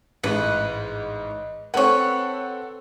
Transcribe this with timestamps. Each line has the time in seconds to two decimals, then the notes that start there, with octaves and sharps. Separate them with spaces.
0.24 A1 G#2 B4 D#5
1.74 C4 A4 B4 C#5 F#5